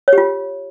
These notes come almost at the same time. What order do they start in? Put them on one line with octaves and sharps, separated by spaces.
C#5 G4 F4